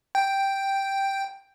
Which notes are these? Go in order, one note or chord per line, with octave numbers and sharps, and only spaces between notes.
G5